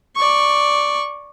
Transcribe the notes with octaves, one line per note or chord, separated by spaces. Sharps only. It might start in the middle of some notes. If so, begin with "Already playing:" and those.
D5 C#6